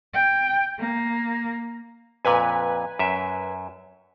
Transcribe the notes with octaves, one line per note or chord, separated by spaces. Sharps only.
G5
A#3
F2 A#2 B4 G#5
F#2 E5